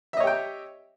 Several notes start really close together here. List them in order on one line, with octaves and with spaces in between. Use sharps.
E5 D#5 C#5 G4 G5